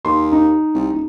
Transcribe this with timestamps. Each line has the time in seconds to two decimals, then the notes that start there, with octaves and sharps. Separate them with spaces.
0.05 D#2 C6
0.32 D#4
0.75 C2
0.93 D#1